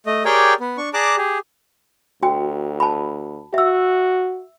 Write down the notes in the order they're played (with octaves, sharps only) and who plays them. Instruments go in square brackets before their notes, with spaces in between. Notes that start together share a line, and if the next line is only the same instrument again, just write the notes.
[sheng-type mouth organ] A3 D#5
G4 G#4 A#4 C#5 D5 G5
B3
D4 C#6
G#4 D5 A5 A#5 D6 F#6
G4 G#4
[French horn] D2 [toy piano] F#4 G5
[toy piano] A5 B5
[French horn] F#4 [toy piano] E5 E6